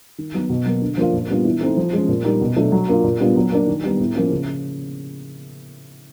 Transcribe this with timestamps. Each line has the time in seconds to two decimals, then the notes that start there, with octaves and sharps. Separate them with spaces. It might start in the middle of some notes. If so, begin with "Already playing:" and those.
0.18 D#3
0.34 F#3 B3 D#4
0.50 B2
0.66 F#3 A#3
0.82 D3
0.97 F3 A#3 D4 F4
1.13 A#2
1.29 G3 B3 D4 F4
1.45 E3
1.61 A3 C4 D#4
1.77 F3
1.93 G#3 C#4
2.09 A#2
2.25 G3 A#3 D#4
2.41 B2
2.56 F#3 A3 D4
2.72 F#3
2.89 A#3 D4 F4
3.04 A#2
3.20 G3 B3 D4 F4
3.36 F#3
3.52 A#3 D4
3.67 D#3
3.84 G3 B3 D#4
4.00 A2
4.15 F3 A#3 C#4
4.31 C#3